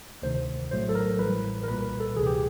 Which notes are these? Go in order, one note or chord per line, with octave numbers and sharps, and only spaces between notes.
D2 C3 D#3 C5
A#1 A2 F#3 A3 C5
A4
A#4
A1 A2 E3 G3 B4
A#4
C2 A#2 G3 B4
A4
D2 C3 E3 G#4
G4